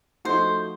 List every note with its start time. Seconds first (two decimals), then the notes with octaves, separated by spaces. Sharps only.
0.25 F3 A3 D#4 F#4 C5